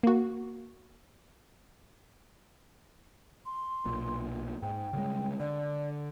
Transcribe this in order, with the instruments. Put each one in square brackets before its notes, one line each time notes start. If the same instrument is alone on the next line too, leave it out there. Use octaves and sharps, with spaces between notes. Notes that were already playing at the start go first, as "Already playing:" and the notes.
[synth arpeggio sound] A#3 F#4
[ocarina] C6
[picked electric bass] B1 A#2
[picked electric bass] G#2 [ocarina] G5
[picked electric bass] C#3 G3 G#3
[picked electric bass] D3 [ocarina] D5